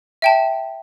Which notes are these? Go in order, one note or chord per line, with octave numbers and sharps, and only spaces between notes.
E5 G5 A5